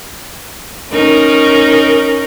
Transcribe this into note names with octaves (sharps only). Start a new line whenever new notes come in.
C#4 D#4 A#4